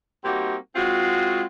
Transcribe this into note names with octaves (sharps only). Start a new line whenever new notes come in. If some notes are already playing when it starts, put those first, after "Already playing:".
G3 A#3 C4 D#4 F#4 G4
G#3 C4 F4 F#4